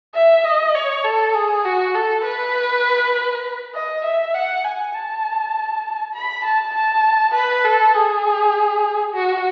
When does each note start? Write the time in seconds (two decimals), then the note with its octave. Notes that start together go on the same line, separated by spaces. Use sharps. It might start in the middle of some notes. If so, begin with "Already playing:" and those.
0.15 E5
0.45 D#5
0.75 C#5
1.04 A4
1.34 G#4
1.65 F#4
1.95 A4
2.24 B4
3.74 D#5
4.05 E5
4.34 F#5
4.64 G#5
4.94 A5
6.14 B5
6.44 A5
6.74 A5
7.34 B4
7.64 A4
7.94 G#4
9.14 F#4